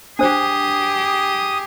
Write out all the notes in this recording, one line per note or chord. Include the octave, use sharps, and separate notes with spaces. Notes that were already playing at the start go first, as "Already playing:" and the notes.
D4 G4 G#4 C5 D#6